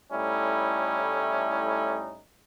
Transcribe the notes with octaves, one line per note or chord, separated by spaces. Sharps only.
A2 G3 A3 C#4 D#4 E4